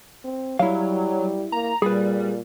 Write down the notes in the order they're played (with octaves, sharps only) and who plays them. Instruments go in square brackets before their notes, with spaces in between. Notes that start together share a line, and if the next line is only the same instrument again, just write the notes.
[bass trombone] C4
[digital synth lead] F#3 [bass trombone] G3 [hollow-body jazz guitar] E4 F5
[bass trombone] A#3 [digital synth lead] A#5
[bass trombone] A#2 [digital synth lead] G3 [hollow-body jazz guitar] G#4 B4